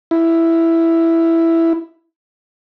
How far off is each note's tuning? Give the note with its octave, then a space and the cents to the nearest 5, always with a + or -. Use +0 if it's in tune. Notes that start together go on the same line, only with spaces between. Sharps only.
E4 +5